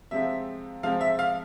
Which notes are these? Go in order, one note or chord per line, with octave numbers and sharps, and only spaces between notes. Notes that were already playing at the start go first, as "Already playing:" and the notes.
C3 F3 G#3 C4 E5
C3 F3 G#3 C4 F5
E5
F5